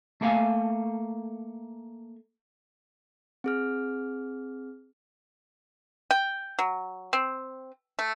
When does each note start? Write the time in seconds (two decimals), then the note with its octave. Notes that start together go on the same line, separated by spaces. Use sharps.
0.21 A3 A#3 A4 F5 G5 G#5
3.44 C4 G#4 F6
6.11 G5
6.59 F#3
7.13 C4
7.99 A3